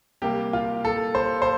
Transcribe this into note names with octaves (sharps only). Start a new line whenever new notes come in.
C3 G3 A#3 G4
F4
A4
C5
C5